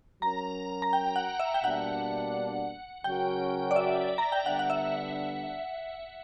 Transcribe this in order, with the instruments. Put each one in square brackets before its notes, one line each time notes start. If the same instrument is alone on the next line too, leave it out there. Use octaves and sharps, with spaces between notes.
[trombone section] F#3 C#4 F#4 A#4 [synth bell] A#5
[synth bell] A#5
G5
F#5
E5
G5
[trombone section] B2 G3 A#3 D4 [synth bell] F#5
[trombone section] C#3 F#3 C#4 F#4 A#4 [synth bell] G5
[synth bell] D5
E5
A#5
G5
[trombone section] D3 G3 B3 D4 [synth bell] F#5
[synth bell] F#5
E5